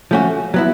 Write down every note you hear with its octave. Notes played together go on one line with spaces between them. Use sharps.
F3 A3 C#4 F#4
F#3 B3 E4